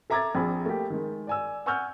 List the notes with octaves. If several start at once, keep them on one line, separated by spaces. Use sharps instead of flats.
A4 E5 A#5 D6 G#6 A6
A#1 C4 G#4 B5
A3 A#3 G4
D#3 G#3
D5 G#5 E6
F#5 G#5 C#6 E6 F6 G6